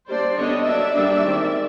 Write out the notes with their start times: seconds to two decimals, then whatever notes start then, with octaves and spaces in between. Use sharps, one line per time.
0.08 G3 A#3 D4 C5 D5
0.37 D3 G3 B3 D4 C#5 D#5
0.65 F#3 A#3 D4 D5 E5
0.94 G3 A#3 D4
1.23 D#3 G#3 C4